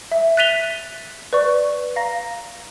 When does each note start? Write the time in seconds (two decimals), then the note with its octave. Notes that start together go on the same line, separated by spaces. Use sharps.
0.12 E5
0.37 F#6 A6 B6 D#7 F7 G7
1.33 B4 D5 C#6
1.96 F5 A#5 A#6